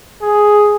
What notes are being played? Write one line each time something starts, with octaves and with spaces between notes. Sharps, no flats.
G#4